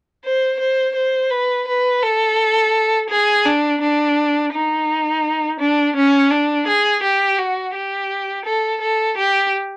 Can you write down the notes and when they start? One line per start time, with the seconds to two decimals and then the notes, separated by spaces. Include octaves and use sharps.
0.24 C5
0.60 C5
0.95 C5
1.30 B4
1.67 B4
2.02 A4
3.10 G#4
3.45 D4
3.81 D4
4.53 D#4
5.60 D4
5.96 C#4
6.31 D4
6.67 G#4
7.03 G4
7.39 F#4
7.74 G4
8.45 A4
8.81 A4
9.17 G4